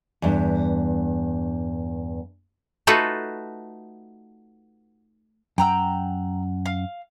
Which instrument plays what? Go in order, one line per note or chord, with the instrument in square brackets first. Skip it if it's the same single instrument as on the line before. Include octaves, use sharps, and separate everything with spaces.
[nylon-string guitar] E2 G2
[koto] A3 D#4 F4 F#4 A4 B4
[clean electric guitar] F#2 F#5 [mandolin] G5 A#5 E6
[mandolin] F5